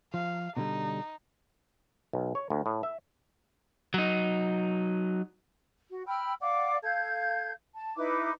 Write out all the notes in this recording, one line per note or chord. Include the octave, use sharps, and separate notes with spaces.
F3 F5
B2 D3 G3 D#4
B1
C#5
D2
A2
E5
F#3 D#4
F#4
G5 B5 E6 F6
D5 F5 F#5 D6
A4 F5 G6 G#6
A5
D#4 E4 B4 D6